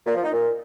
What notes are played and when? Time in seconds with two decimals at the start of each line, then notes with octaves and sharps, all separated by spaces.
0.06 A#2
0.15 F3
0.24 D#4
0.32 A#2